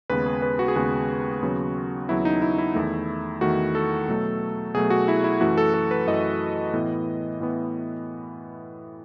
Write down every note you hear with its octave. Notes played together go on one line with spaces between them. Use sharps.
D#2 C#3 G#3 B3 B4
G#4
B4
F#4
G#4
D#2 C#3 G#3 B3 F#4
D#2 C#3 F#3 B3
D#2 C#3 F#3 B3 E4
D#4
E4
E4
E2 D#3 A3
E2 D#3 A3 F#4
A4
B2 F#3 A3
B2 F#3 A3 G#4
F#4
E4
E4
F#2 E3 A3 F#4
A4
A4
B4
F#2 E3 A3 D#5
A2 E3 B3
A2 E3 B3